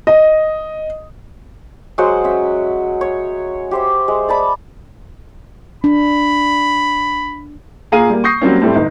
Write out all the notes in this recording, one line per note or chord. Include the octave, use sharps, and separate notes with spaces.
D#5
F#3 G#3 C5 F#5
C#4 E5
C#5
G4 C5 E5
G#3
D5 A5 B5
D4 B5
A#2 G#4 F5 A#5 D#7
G3 A#3
C#6 D#6 G6 A#6 C7
F#3 G3 A#3 C4 C#4
A2 G3 A3 C4
G1 D#4